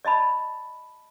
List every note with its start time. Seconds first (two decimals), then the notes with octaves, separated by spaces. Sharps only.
0.05 D5 D#5 A5 B5